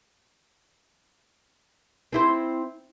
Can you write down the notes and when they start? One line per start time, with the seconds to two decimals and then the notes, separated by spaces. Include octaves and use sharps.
2.13 C4 E4 C5